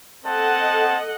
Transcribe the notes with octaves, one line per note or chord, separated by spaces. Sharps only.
C4 A4 D#5 F#5 A5